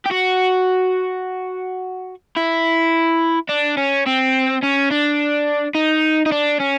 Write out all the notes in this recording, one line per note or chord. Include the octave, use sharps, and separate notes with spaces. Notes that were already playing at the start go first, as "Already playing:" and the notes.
G4
F#4
E4
D4
C#4
C4
C#4
D4
D#4
D#4
D4
C#4